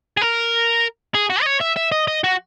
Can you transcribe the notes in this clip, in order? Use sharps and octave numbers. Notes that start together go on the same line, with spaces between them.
G#4
A#4
G#4
F#4
D#5
C#5
E5
E5
D#5
D#5
F#4